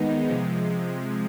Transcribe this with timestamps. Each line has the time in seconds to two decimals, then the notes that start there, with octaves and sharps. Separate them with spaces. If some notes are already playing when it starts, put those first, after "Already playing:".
Already playing: D#3 G#3 B3 D#4
0.27 C3 F3 G#3